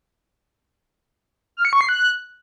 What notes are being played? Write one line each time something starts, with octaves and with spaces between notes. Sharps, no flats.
F6
C#7
C#6
C7
F#6